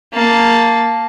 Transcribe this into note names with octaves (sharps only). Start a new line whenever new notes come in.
A#3 A5